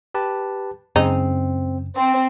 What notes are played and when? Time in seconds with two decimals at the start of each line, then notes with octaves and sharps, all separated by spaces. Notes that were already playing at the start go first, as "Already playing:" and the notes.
0.14 G4 B4 A5
0.96 F#2 C#3 G#3 C4 D#4
1.96 C4